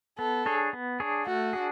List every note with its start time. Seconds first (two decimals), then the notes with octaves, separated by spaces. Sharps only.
0.19 B3 A4
0.46 D4 G#4 C#5
0.73 B3
1.00 D4 G#4 C#5
1.26 A3 F#4
1.53 D4 G#4